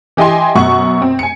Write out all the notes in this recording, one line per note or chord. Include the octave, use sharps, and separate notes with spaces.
E3 G4 D#5 G#5 C6
F#2 B2 F#5 C#6
C4
G#5 C#7